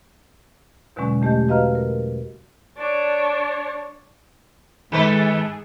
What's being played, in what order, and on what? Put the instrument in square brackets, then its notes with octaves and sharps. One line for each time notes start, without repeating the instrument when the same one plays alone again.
[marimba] E2 B2 D3 F#3 G#3 C#4
E2 A3 G4 D#5 G6
F#4 B4 D#5 F5 A#5 F6
A#4
[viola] D4 C#5
[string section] G#2 G#4 [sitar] D#3 A4 B4